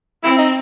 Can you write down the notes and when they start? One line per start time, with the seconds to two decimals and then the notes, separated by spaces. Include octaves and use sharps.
0.24 C4 E4
0.39 D#4